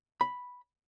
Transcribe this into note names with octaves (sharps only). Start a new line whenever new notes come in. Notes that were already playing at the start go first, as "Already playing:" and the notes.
B5